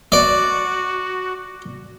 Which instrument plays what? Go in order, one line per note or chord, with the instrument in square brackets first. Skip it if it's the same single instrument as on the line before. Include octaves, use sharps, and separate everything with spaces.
[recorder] F#4 [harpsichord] D5